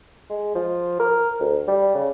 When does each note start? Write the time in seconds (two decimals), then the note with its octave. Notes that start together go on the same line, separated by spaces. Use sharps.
0.30 G#3
0.55 F3
1.00 A#4
1.40 D2
1.68 G3
1.95 C#3